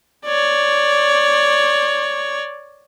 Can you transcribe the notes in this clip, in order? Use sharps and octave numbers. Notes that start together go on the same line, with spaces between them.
C#5 D5